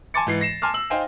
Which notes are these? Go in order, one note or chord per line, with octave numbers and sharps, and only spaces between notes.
G#5 A5 C6 D6 A6 C#7
G#2 E3 C7
A#6 C7 E7
G#5 A5 C6 D6 F6
E6 F#7
D#4 C5 F5 G5 G#5